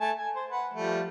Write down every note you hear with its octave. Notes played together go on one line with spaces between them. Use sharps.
A3 G#5 A5
G#5
C5
B4 F#5
F3 G3 A3